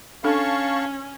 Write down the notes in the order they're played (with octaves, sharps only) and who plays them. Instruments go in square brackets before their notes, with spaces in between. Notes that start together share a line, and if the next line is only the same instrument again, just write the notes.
[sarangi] C#4 [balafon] D4 A4 [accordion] F5 A5 C#6